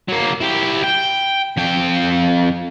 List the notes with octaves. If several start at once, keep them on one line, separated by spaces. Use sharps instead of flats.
F#3 A#3
E4 G4
G5
F2 G5